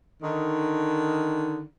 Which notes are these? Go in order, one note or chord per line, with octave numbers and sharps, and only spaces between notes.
D3 D#3